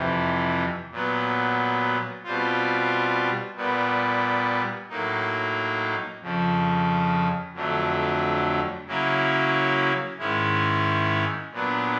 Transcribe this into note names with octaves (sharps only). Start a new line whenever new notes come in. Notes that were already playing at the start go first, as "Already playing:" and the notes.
Already playing: F2 C3 E3
A#2 F#3 B3
B2 G3 C4 F4
A#2 G3 B3
A2 F#3 A#3 D#4
F2 C#3 F3
F2 D3 F#3 A3
C#3 F#3 A#3 C#4 E4
G#2 D#3 G#3 C#4 E4
A#2 F#3 B3 D4